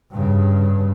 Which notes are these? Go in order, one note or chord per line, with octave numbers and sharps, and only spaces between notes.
G2 C#3